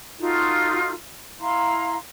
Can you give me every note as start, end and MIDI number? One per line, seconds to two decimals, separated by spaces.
0.19 0.93 63
0.19 0.93 65
0.19 0.93 66
0.19 0.93 69
1.40 1.96 64
1.40 1.96 77
1.40 1.96 82
1.40 1.96 84